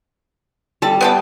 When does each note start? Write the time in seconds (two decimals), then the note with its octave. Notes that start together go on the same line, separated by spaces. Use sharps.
0.82 G3 A4 A5
1.01 B3 G5 A5